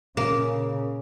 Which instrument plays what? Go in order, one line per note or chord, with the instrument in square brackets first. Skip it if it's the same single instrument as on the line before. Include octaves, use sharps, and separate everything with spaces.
[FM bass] A#2 [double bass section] C#3 [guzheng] A#3